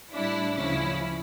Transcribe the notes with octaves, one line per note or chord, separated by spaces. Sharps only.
A2 G3 D4 E4
D2 C#3 F3 C#4 E4